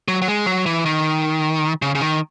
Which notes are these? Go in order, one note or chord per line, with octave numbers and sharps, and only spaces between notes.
F#3
F#3
G#3
F#3
E3
D#3
C#3
C#3
D#3